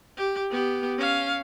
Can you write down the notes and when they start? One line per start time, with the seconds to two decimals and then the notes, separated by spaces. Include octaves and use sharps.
0.17 G4
0.50 B3 G4
0.98 C#4 F5